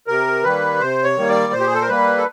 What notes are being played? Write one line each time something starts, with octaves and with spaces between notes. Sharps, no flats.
C3 A#4
D#3 G3 A#3 B4
C3 C5
C#5
D#3 G3 A#3
D5
A#2 C5
G4
G#4
A4
A#4
G3 A#3 B4
A4